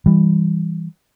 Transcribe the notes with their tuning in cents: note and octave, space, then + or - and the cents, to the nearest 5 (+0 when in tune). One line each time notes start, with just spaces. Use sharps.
E3 +0 G3 +15